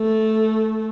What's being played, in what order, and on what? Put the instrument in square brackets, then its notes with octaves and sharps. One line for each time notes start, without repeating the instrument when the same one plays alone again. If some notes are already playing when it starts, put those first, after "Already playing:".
Already playing: [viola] A3